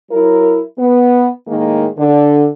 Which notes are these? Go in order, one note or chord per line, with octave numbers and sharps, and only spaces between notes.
F#3 E4 A#4
B3
A2 D#3 G#3 A#3
D3